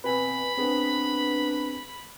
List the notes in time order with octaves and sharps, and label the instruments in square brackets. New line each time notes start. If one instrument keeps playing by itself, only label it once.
[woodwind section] B2 C4 [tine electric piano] B4 G#5 [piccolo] B5
[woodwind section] B3 D4 [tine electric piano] C4 G#4 B4